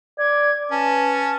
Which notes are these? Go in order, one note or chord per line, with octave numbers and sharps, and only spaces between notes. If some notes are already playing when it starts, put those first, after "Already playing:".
D5 G#6
C#4 B4 A5